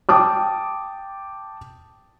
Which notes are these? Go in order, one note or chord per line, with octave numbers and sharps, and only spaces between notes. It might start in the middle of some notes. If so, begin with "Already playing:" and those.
G5 A5 D6 D#6